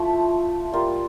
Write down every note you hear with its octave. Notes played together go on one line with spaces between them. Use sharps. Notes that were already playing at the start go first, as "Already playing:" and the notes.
Already playing: F3 A3 E4
G3 A#3 F4